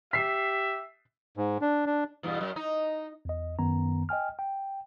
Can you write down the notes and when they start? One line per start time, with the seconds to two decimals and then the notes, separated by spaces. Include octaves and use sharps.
0.13 G4 E5 B6 C7
1.37 G#2
1.61 D4
1.86 D4
2.23 E2 G2 B2
2.41 F#2
2.56 D#4
3.25 E2 D#5
3.59 F#2 D#3 B3 A#5
4.09 D#5 G5 G#5 F6
4.39 G5